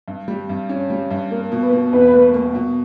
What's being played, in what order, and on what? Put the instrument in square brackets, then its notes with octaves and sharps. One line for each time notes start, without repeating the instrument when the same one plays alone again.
[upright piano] G2
G3
G2
C#4
G3
G2
[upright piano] A#3 [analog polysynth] A#4
[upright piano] B2
[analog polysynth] B4
[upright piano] B2
[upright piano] E2 [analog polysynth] B4
[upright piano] A#3
A#3
B2